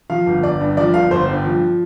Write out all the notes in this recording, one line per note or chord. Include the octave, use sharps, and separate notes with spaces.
F3 F5
G1
G1 D5
G2
F3 D5
G1 F5
G1 C5
G2
F3